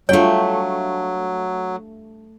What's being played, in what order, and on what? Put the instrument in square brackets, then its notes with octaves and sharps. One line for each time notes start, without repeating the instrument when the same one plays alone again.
[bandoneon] F#3 [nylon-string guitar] G3 D4 F4 [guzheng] A3 G5 [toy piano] C#5